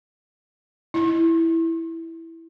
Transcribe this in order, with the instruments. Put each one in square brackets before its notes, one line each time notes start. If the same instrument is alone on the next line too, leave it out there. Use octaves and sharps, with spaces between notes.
[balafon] E4